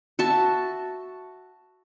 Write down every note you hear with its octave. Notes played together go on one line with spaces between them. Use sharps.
F#4 E5 A5